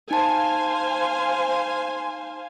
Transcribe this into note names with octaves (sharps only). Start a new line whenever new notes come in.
D#4 C5 F5 G#5 A5